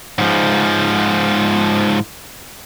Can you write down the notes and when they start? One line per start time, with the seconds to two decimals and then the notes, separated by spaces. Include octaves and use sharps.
0.19 G#2 F3